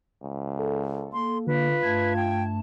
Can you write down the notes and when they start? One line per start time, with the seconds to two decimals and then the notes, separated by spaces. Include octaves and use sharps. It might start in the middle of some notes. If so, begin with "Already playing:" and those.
0.23 C#2
0.59 A4
1.13 A#3 C6
1.47 D3 F4 B4
1.83 G2 A3 A5 G#6
2.16 G5